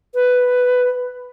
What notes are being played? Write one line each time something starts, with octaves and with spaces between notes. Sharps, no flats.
B4